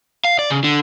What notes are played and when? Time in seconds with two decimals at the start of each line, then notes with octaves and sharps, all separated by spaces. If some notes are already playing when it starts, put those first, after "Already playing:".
0.25 F5
0.39 D5
0.50 C#3
0.64 D3